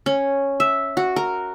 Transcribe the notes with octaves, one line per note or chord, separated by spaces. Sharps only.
C#4
E5
F#4
A#4